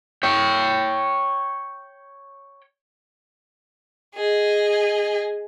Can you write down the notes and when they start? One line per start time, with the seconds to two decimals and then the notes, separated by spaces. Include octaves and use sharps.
0.23 C#5 G5
4.15 G#4 D#5